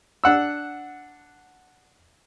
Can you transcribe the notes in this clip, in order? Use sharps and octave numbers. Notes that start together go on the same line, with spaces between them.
D4 F#5 E6